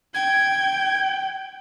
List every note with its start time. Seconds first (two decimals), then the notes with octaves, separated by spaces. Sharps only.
0.14 G5 G#6